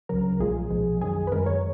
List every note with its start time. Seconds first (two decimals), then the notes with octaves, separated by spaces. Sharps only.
0.09 C#2 C#3 F#3 A#4
0.40 B1 A#2 F3 G#3 G#4
0.70 B1 A#2 F3 G#3
1.01 F#2 D#3 G#3 G#4
1.27 B4
1.32 F#2 D#3 G#3 A#4
1.46 C#5